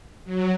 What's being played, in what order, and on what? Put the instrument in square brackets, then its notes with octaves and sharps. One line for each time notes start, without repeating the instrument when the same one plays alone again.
[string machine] F#3